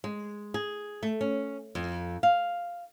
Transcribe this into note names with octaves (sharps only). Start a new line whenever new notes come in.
G#3
G#4
A3
C#4
F2
F5